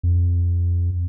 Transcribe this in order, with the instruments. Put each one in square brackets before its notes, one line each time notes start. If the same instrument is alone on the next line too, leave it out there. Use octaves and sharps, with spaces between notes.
[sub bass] F2